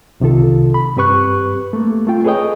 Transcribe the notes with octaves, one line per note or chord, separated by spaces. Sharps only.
C2 C3 D#3 F4 A4
B5
G2 C4 G4 B4 C#6 F#6
A3 A#3
A3 C4 F4 G5
G#4 A4 B4 C#5 D#5 G5